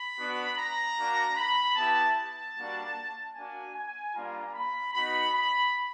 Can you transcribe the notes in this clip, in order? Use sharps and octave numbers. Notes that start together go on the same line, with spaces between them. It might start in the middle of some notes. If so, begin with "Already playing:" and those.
Already playing: B5
B3 D4 F#4
A#5
A#3 D4 F#4
B5
B3 E4 G4 A5
A5
G3 A#3 D4 F#4
A#3 D4 F#4 G#5
G#5
G3 A#3 D4 F4 A#5
B5
B3 D#4 F#4 B5
B5